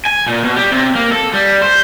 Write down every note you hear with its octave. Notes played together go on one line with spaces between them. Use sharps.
G#5
A#2
B2
G3
C3
A#3
A4
G3
C5